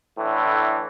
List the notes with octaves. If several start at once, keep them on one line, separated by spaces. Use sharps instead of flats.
A2 D3 E3